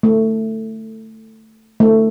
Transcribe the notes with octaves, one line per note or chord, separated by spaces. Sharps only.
A3
A3